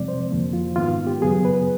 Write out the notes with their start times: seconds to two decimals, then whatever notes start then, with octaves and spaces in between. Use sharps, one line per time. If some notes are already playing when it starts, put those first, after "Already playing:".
Already playing: E2 C3 F3 G#3 C4 D5
0.08 C5
0.31 F2 D3 F3 A#3
0.53 F4
0.76 G#2 D#3 G#3 B3 F4
1.07 G4
1.22 F#2 C#3 F#3 B3 G#4
1.45 B4